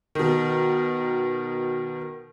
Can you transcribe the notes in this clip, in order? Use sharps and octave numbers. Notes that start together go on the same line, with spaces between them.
B2 D#3